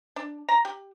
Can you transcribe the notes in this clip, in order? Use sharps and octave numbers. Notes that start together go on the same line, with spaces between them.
D4
A#5
G4